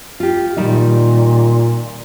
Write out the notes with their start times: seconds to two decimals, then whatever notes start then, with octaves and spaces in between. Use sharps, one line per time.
0.20 F4 G4
0.57 A#2 D#3 G3 D#4